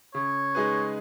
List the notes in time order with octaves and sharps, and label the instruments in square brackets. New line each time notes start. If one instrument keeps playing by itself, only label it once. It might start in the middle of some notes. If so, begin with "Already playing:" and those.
[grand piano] C#3 [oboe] C#5
[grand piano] G#3 D#4 G#4 B4